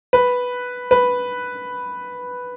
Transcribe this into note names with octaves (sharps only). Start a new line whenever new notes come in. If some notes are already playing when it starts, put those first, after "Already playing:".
B4
B4